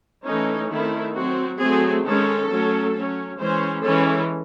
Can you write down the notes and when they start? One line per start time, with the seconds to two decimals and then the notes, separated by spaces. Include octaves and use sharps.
0.25 E3 A3 C#4 D#4
0.69 D#3 A3 C4 E4
1.14 F#3 C4 F#4
1.59 F#3 A3 C4 G#4
2.04 D#3 G#3 C#4 A4
2.49 F#3 A3 C#4
2.94 F#3 C#4
3.39 E3 G#3 C#4 C5
3.84 E3 G#3 C#4 A4